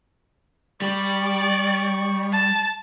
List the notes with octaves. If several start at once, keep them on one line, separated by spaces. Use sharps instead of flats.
G3 D5 C#6
A5